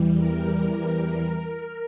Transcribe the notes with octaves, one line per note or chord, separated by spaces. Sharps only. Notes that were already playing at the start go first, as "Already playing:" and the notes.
Already playing: E2 E3 G3
A#4